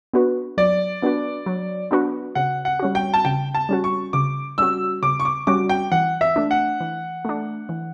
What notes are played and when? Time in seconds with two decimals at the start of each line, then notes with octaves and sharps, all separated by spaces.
0.13 B3 D4 F#4 B4
0.57 F#3 D5
1.02 B3 D4 F#4 B4
1.46 F#3
1.91 B3 D4 F#4 B4
2.35 C#3 F#5
2.65 F#5
2.80 G3 C#4 F#4
2.95 G5
3.14 A5
3.25 C#3 G5
3.54 A5
3.69 G3 C#4 F#4
3.84 C#6
4.13 C#3 D6
4.58 G3 C#4 F#4 E6
5.03 C#3 D6
5.20 C#6
5.25 D6
5.47 G3 C#4 F#4 D6
5.69 G5
5.92 E3 F#5
6.21 E5
6.36 A3 D4
6.51 F#5
6.80 E3
7.25 A3 D4
7.69 E3